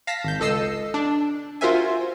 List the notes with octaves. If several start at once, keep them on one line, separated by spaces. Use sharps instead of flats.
F5 A5 A#6 B6
G#1 G6
C#2 A4 D#5 E6 C7
D4
F4 F#4 A#4 C5 E5 G#5